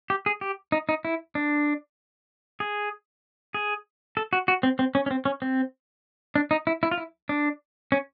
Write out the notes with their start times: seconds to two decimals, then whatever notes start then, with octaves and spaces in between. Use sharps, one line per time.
0.10 G4
0.26 G#4
0.41 G4
0.72 D#4
0.89 D#4
1.05 E4
1.35 D4
2.60 G#4
3.54 G#4
4.17 A4
4.33 F#4
4.48 F#4
4.63 C4
4.79 C4
4.95 C#4
5.06 C#4
5.11 C4
5.25 C#4
5.42 C4
6.35 D4
6.51 D#4
6.67 E4
6.83 E4
6.91 F4
6.98 E4
7.29 D4
7.92 C#4